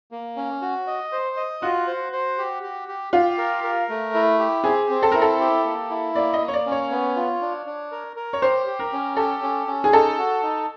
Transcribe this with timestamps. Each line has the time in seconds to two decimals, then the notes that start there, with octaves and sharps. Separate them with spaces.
0.12 A#3
0.36 C#4
0.61 F#4
0.87 D#5
1.12 C5
1.37 D#5
1.62 F4 F#4
1.87 C5
2.12 C5
2.38 G4
2.63 G4
2.88 G4
3.13 F4 G4
3.38 A#4
3.64 A#4
3.89 A3
4.14 E4
4.39 G4
4.64 C4 G#4
4.90 C4
5.03 A4
5.12 E4 A#4
5.22 A4
5.40 G4
5.65 A#3
5.90 E4
6.15 A#3 D5
6.33 D#5
6.40 A#3
6.48 C#5
6.54 D5
6.66 C#4
6.72 C#5
6.91 B3
7.16 F4
7.41 D4
7.66 D4
7.92 A#4
8.16 A#4
8.33 C#5
8.41 G4 C5
8.67 G4
8.79 A#4
8.92 C#4
9.17 G4 A4
9.42 C#4
9.67 C#4
9.84 G#4
9.93 D#4 A4
10.17 F#4
10.43 D#4